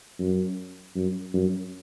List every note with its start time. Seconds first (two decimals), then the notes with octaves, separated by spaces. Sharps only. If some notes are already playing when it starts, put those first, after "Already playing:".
0.19 F#2
0.95 F#2
1.33 F#2